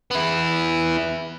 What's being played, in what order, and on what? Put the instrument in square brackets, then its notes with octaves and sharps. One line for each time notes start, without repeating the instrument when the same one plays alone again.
[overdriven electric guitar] B3 E4